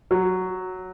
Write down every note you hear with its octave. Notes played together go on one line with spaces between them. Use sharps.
F#3